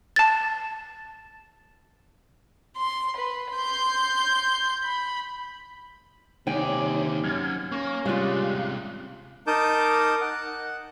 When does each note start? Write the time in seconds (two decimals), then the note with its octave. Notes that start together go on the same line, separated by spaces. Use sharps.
0.16 A5 A6
2.77 C6
3.17 B4
3.52 C6 G6
4.84 B5
6.47 D#2 C3 D#4 C#5 D5 G5 G#5
7.24 F#2 F6 G#6
7.72 A#3 C#4 C#6
8.05 C3 G3 G#3 F4 F5 F#6
9.47 D#4 A#4 A5 D6 D#6 G6
10.21 F#5